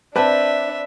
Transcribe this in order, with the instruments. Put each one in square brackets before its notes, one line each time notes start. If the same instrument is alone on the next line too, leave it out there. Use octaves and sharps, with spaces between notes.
[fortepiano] C4 B4 [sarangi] D4 [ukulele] D5 A5 [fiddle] E5